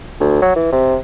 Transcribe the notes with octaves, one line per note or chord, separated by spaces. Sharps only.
D2
F#3
E3
C3